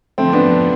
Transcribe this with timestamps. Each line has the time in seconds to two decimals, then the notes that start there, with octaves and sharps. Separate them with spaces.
0.18 F2 D3 F3 A3 C4
0.33 B3 D4